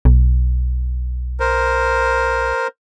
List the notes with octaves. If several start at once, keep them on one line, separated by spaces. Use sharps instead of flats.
B1
A#4 C5